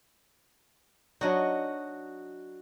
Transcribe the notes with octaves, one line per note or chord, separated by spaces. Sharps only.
F#3 D4 D#4 F#4 D#5